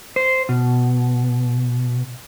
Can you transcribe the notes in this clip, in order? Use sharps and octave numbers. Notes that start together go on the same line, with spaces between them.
C5
B2